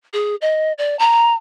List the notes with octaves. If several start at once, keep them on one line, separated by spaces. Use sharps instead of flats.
G#4
D#5
D5
A#5